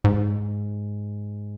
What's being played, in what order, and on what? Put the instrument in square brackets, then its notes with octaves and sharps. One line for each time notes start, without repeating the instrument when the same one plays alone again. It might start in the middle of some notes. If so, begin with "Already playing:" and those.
[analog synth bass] G#2